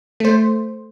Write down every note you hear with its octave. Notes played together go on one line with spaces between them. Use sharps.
A3 C5